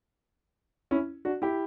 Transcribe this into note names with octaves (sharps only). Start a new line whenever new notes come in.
C#4 E4
D4 F#4
E4 G4